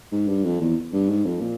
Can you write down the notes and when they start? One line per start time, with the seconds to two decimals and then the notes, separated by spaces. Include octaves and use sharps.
0.12 G#2
0.27 G2
0.44 F2
0.61 E2
0.93 G2
1.09 G#2
1.25 F2
1.40 A#2